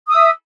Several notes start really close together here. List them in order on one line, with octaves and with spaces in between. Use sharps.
D#6 E6 E5